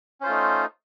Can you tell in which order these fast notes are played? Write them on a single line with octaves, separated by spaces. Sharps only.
C#4 C5 F4 A3 D#4